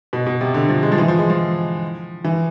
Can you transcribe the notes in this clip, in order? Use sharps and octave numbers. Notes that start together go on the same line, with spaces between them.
B2
B2
C3
D3
F3
G#3
F3
E3
F3
G#3
F3
E3